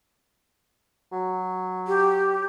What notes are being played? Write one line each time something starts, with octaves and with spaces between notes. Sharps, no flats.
F#3
G4